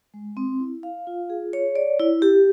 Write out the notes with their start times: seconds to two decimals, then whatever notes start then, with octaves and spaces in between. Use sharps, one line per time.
0.14 G#3
0.37 C4
0.60 E4
0.83 F5
1.07 F4
1.30 G#4
1.53 C#5
1.76 D5
1.99 E4
2.22 G4